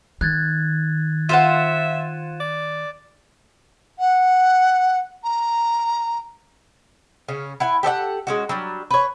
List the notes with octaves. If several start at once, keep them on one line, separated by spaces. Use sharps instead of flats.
D#3 F#6 G#6 A6
F4 C5 E5 F#5 D#7 E7
D5
F#5
A#5
C#3 C#4
E4 F#5 G#5
G4 A4 D5 F#5
G#3 C#4 F#4
F#3 G3 D4
B4 C#5